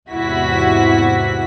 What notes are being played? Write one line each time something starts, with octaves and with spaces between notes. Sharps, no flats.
E2 G#2 C3 E4 F#4 B6